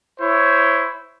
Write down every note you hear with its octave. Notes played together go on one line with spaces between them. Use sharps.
E4 C5 C#5